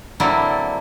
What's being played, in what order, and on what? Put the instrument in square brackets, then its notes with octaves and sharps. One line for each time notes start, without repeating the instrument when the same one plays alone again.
[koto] D3 F#3 A#3 C4 E4 D5